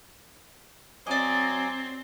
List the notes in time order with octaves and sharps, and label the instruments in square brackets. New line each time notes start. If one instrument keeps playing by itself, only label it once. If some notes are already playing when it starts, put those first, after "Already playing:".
[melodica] F#3 G#5 D6 [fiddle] C4 [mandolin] D5 D#5